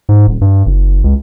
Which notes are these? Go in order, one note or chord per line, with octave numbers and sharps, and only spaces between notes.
G#2
D#1
G2
F#1
C#2